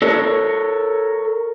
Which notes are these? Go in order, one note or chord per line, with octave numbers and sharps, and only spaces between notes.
A4 A#4 C#5